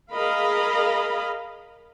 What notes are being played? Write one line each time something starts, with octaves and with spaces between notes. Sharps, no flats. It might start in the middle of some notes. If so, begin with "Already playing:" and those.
G#4 A#4 D#5 F5 B5